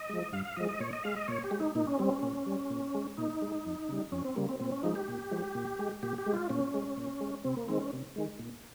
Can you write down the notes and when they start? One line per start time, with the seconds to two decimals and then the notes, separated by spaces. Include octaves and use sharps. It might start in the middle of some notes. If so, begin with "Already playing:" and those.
Already playing: D#5
0.09 F3 G#3
0.32 G2 F5
0.45 F5
0.56 F3 G#3 D#5
0.69 D#5
0.80 A#2 C#5
0.93 D#5
1.04 G#3 F5
1.16 D#5
1.28 A#2 C#5
1.44 G4
1.51 G#3
1.60 D#4
1.75 A#2 D#4
1.87 C#4
1.99 G3 C4
2.11 C#4
2.23 A#2
2.46 G3
2.70 A#2
2.95 G#3
3.17 A#2 D#4
3.42 G#3
3.66 F2
3.89 C#3 G3
4.12 F2 C#4
4.25 C4
4.36 C#3 G3 A#3
4.49 C4
4.60 A#2 C4
4.72 C#4
4.83 F3 G#3 D#4
4.95 G4
5.08 A#2
5.31 F3 G#3
5.55 A#2
5.79 G#3
6.03 A#2 G4
6.18 G4
6.26 G#3
6.34 F4
6.49 A#2 C#4
6.74 G#3
6.97 A#2
7.21 G#3
7.44 C3 C4
7.57 A#3
7.68 D#3 G#3 C4
7.80 C#4
7.93 C3
8.16 D#3 G#3
8.39 A#2